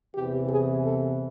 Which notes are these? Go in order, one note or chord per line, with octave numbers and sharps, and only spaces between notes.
E2 C3 E3 G4
G#4
A4